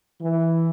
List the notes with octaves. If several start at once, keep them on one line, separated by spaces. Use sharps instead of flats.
E3